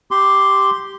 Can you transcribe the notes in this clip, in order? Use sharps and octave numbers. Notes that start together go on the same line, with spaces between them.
G4 C6